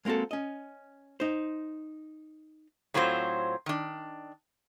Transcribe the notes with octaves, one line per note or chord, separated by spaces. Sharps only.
G#3 A#3 C4 F#4 A4
C#4 D#5
D#4 C5
A2 F#3 C4 F4 C5
D#3 D4